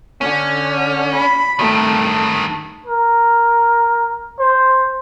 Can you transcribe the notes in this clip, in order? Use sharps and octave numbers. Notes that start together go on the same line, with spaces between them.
D3 C#4
B5
G2 D#3 A3
A#4
C5